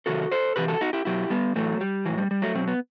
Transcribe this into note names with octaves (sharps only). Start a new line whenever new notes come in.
C3 D#3 F#3 F#4 A4
A4 C5
C3 E3 G4 B4
F#4 A4
D#4 F#4
E4 G4
B2 F#3 E4 G4
G3 B3
A2 E3 F#3 A3
G3
A2 E3 F#3
G3
G3
F#3 A3
B2 F#3 C4
B3